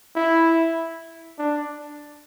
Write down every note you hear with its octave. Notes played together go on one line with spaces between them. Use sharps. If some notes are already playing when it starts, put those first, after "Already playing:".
E4
D4